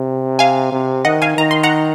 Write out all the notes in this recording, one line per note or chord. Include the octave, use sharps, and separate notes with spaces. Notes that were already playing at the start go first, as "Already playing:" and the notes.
Already playing: C3
F5 G#5
C3
D#3 D#5 F#5
F5 G#5
D#3 A#5
C6
F#5 A#5